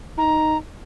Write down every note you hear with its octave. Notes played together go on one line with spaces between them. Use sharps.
D#4 A#5